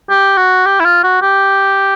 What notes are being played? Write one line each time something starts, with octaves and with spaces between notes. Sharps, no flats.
G4
F#4
G4
E4
F4
F#4
G4